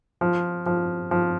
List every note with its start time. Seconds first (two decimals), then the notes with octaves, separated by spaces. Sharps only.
0.21 F3
0.66 F3
1.11 F3